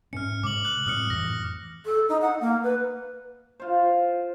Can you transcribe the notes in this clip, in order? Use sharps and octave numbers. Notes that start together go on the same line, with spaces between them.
G#2 C#4 F6 C#7
C3 G#3 D6 F#7
F#6 F#7
A2 G3 C4 D#6 F6 C#7
F2 A2 E3 A#6
A4
D#4
F#5
A#3
B4
F4 C5